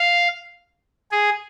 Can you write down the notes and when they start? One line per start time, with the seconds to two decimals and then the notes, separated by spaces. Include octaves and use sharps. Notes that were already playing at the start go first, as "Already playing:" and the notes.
Already playing: F5
1.12 G#4